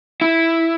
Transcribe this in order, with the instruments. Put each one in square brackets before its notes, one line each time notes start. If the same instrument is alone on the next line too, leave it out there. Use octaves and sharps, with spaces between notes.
[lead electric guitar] E4